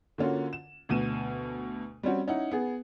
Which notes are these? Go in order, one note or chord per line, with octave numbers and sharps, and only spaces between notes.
D3 A#3 C#4 F4 F#4
E7
D2 B2 D#7 E7
G3 C4 C#4 F#4
C#4 D#4 E4 F#5
B3 G#4